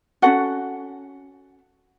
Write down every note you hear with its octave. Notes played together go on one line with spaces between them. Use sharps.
C#4 F4 F#4 A4 F#5